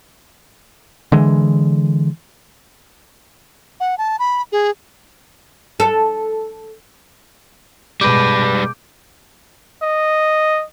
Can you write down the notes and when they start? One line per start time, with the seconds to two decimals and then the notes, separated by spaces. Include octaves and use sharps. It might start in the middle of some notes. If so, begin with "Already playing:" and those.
1.12 D3 E3 G#3
3.80 F#5
3.98 A5
4.19 B5
4.52 G#4
5.80 A4
8.01 B2 G3 G#3 B4 D6 G6 D7
9.83 D#5